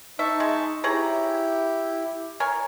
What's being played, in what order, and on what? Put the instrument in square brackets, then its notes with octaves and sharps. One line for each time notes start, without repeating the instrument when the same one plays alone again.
[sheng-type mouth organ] D#4 A5 C#6 [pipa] E5
[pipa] G#3
[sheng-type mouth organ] E4 G4 [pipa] G#4 C#5 A#5
[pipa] A#4 C#5 G#5